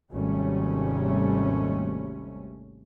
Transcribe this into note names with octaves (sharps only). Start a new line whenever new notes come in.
G#1 D#2 C3 G3 A3 C#4